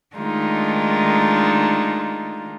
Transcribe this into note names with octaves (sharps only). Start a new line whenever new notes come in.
D#3 G#3 A3 D4 D#4 F4